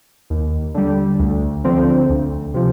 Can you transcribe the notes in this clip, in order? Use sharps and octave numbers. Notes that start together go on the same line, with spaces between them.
D#2
D3 G3
D2
D3 F3 C4
D2
C3 F3